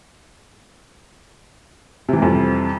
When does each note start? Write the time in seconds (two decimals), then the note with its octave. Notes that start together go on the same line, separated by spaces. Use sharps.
2.09 C3
2.13 E3
2.18 G3
2.22 F2